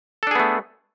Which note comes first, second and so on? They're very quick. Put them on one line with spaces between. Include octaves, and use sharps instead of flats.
A4 D4 G#4 B3 A3